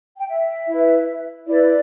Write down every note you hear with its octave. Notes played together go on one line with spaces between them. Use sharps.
G5
E5
E4 B4
E4 B4 D5